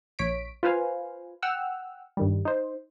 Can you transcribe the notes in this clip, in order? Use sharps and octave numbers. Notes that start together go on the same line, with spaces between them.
A#1 C#5 B6 D7
F4 B4 C5 F5 G#5
F#5 G5 E6 F6
G2 D#3 G3
D#4 C5